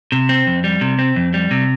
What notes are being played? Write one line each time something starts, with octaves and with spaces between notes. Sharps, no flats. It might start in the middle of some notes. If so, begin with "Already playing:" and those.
C3
C4
F2
G3
C3
C4
F2
G3
C3